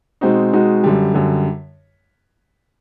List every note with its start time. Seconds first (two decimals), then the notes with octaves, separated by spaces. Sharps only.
0.21 B2 G#3 C4 D#4 F#4
0.53 B2 G#3 C4 D#4 F#4
0.84 F#2 D3 G3
1.14 F#2 D3 G3